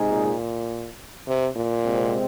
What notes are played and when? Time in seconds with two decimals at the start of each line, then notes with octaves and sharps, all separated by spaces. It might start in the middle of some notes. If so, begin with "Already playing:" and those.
Already playing: C3 G#3 D#4 G#4
0.11 A#2
1.28 C3
1.56 A#2
1.85 C3 G#3 C4